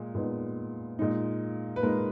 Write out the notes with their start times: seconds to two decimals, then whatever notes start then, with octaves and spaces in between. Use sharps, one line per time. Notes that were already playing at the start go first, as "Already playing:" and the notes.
Already playing: A#2 G#3
0.15 A#2 G#3 B3 D#4
0.99 A#2 G#3 D#4
1.76 B4
1.83 A#2 G#3 D#4 A#4